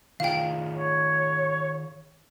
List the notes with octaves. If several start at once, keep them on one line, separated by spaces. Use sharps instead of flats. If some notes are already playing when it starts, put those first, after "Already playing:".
D#3 F4 G#4 F5 G5
C#5